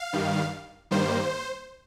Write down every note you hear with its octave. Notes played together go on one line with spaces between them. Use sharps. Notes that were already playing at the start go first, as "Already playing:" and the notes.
Already playing: F5
G2 D#3 G3
G2 D#3 G3 A#3 C5